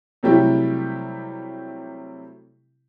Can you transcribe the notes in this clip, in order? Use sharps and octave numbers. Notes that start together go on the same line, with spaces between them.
C3 F#3 G3 A3 E4 G4